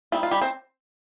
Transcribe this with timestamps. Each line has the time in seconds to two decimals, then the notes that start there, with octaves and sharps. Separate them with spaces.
0.12 G3 C4 D#4 F4
0.23 F4
0.31 G3 G4
0.41 C4 C5